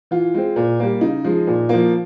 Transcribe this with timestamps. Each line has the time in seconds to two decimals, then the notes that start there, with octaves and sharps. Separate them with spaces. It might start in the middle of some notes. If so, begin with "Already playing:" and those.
0.11 E3 F4
0.34 G#3 C4
0.56 A#2
0.80 G3 A#3
1.01 C#3 D#4
1.24 F3 G#3
1.47 A#2
1.69 F3 A#3